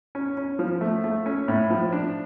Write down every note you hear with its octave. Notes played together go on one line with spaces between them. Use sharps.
C#4
C#4
F3
A3
A3
C#4
A2
F3
D4